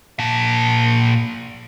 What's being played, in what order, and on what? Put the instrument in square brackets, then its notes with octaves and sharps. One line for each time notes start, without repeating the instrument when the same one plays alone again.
[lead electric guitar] A#2 A5